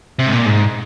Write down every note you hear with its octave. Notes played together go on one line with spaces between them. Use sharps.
C3
G#2
A#2
G#2